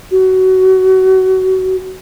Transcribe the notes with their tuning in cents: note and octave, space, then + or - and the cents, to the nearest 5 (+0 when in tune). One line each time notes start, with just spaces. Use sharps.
F#4 +25